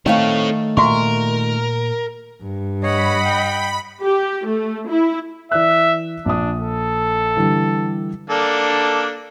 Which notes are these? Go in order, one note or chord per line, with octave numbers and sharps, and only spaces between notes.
D#3 A3 C4 A4 C#5 F5
A#2 F#4 A#4 E5 C#6
G2
C#5 D#5 F#5 B5
G5
G4
A3
E4
E3 D5 E5 F#6
A#1 D4 D#6
A4
D3 E3 G3
A#3 D4 A4